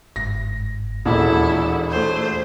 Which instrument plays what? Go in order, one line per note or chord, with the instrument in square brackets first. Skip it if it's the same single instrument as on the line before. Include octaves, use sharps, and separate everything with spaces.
[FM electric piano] G1 G#2 [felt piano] A#6
[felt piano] E1 A1 A#2 [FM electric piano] D#2 [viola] E4 A4
[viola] A3 C5